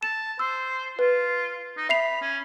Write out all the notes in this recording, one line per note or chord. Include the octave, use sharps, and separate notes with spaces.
A5 E7
C5 E6
F4 B4
D#4
E5 B5 C7 F7
C#4